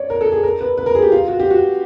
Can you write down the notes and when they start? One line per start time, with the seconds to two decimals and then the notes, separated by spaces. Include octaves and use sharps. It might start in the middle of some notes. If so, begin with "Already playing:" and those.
Already playing: C#5 D5
0.10 A#4
0.21 A4
0.32 G#4
0.43 A#4
0.61 B4
0.78 B4
0.86 A#4
0.95 G#4
1.02 G4
1.12 F4
1.28 F#4
1.40 G4
1.51 F#4